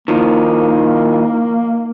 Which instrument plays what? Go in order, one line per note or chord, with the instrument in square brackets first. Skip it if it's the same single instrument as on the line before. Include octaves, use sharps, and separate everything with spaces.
[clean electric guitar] D#3 F3 D#4 [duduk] A#3